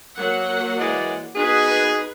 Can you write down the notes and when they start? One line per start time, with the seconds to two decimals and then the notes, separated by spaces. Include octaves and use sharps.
0.18 F#3 A#3 F#5
0.78 E3 G#3 D5
1.35 B3 D#4 F#4 G#4 B4